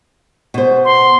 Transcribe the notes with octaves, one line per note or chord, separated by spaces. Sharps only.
B2 C5
C6